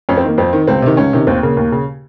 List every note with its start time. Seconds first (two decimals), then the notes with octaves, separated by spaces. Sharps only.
0.09 F2 C#4
0.17 C4
0.23 D#3 A#3
0.38 F2 C4
0.53 D#3
0.67 C#2 C4
0.82 C3 D#3
0.97 C#2 C#4
1.13 C3 D#3
1.27 D#2 C4
1.43 C#3 A#3
1.57 D#2
1.72 C#3